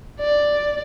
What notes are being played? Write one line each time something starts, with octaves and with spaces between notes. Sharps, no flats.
D5